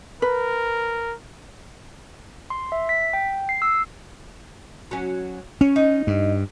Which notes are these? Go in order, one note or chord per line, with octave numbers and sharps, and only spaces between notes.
A#4 B4
C6
E5
B6
G5
C7
E6
F#3 C#4
C#4 C#5
D#4
G2